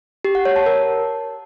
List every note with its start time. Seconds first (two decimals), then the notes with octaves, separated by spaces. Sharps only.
0.25 G4
0.35 F#5
0.45 C#5
0.56 A5
0.66 A#4